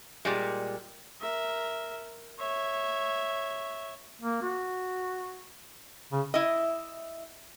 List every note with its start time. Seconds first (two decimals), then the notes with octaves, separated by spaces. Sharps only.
0.25 A#2 G3 G#3
1.21 A#4 E5
2.39 C#5 E5
4.21 A#3
4.42 F#4
6.13 C#3
6.34 E4 D#5